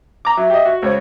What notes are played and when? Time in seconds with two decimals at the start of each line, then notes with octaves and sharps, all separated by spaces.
0.25 A#5 D6
0.37 F#3 E5
0.50 G4 D#5
0.66 F#4
0.82 C#2 C5 C#5